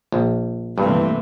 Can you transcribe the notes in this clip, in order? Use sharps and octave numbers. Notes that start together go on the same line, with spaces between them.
A#1
G2 C3 E3 A3 A#3 C4